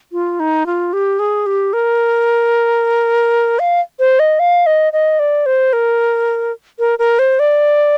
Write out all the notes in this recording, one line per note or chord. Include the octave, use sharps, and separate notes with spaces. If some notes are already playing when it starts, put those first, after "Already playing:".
F4
D#4
F4
G4
G#4
G4
A#4
F5
C5
D#5
F5
D#5
D#5
D5
C5
A#4
A#4
A#4
C5
D5